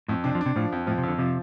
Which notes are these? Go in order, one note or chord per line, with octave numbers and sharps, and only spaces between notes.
F2 A2
C3 D4
F3
C3 D4
A2 F3
F2
A2 F3
C3
F2 D3
C3 F3